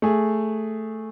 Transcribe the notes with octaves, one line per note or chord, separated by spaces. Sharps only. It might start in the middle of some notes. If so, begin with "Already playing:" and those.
A3 G#4